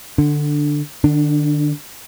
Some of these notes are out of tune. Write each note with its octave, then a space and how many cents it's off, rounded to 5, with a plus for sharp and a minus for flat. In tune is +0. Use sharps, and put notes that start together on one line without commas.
D3 +10 D4 +0
D3 +40 D4 +0